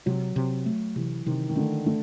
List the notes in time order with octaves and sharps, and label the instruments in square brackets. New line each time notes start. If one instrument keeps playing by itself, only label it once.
[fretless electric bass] C3 [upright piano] F#3
[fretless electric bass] C3
A3
[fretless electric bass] C3 [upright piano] E3
[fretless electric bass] C3 [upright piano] D#3
[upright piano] D#3
[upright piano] D3 [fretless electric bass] A3
[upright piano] D3 [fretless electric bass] A3